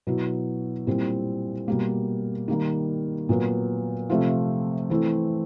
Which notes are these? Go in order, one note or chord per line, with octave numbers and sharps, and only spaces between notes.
B2 F#3 B3 E4
A#2 G3 C4 E4
B2 G3 A#3
D#3 G3 A#3
A#2 F#3 B3
C3 F3 A3 C4 F4
E3 A3 C4 E4